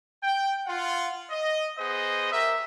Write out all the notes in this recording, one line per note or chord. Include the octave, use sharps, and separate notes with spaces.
G5
F4 F#5
D#5
B3 G#4 C5 D#5
G4 A#4 E5